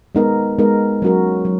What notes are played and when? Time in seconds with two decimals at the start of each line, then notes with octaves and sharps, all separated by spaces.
0.15 G#3 B3 D#4 A#4
0.59 G#3 B3 D#4 A#4
1.02 F#3 C#4 F#4 A#4
1.45 F#3